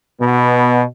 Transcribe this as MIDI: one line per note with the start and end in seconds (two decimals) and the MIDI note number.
0.21 0.83 47
0.21 0.83 59